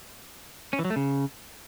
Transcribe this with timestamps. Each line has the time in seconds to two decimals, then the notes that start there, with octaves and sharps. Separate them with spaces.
0.73 C#4
0.79 E3
0.85 F#3
0.90 A3
0.96 C#3